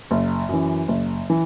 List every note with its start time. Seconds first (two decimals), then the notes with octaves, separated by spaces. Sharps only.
0.11 F#1
0.49 F#2 E3
0.88 F#1
1.30 E3